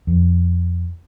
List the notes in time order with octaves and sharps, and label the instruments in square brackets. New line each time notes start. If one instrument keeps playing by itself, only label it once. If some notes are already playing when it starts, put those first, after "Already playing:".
[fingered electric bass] F2